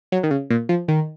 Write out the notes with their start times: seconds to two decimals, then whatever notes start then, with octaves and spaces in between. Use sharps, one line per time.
0.12 F#3
0.23 D#3
0.31 C#3
0.50 A#2
0.69 F3
0.88 D#3